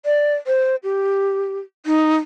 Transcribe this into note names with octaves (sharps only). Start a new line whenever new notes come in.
D5
C5
G4
D#4